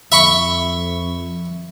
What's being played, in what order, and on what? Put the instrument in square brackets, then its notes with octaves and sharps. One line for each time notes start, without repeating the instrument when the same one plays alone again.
[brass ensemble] F2 [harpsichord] E5 B5 C#6